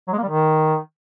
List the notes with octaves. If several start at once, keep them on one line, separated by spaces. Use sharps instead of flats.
F#3
G#3
A#3
G3
D#3